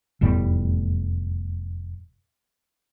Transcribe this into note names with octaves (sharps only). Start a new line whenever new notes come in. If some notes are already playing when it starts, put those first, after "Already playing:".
F1 E2 A2 G3